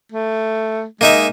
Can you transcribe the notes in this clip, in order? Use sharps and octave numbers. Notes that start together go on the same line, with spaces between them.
A3
G#3 A#3 D#4 E5